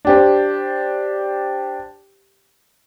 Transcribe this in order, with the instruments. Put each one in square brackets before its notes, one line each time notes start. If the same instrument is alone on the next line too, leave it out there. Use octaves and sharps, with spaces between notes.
[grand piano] D4 G4 C5